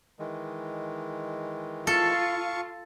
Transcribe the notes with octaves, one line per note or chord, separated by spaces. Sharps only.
D#3 E3 G#3
F4 A4 F5 A5 C#6